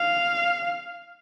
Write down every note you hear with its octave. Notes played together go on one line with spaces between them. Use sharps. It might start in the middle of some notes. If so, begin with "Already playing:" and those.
Already playing: F5